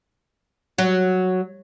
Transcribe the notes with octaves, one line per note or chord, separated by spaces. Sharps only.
F#3